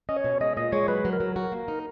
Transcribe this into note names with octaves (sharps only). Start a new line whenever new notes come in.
C#4 D#5
C#5
B2
G#3 D#5
A#2 D#5
G#3 C#5
F#3 B4
F#3
A#4
F#3
F#4 A#4
A#3
D#4